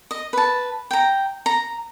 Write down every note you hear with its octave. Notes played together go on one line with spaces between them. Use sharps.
D#5
B4 A5
G5 A#5
A#5